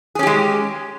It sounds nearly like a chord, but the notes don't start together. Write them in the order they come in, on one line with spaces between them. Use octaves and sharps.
G#4 C#4 G4 G#3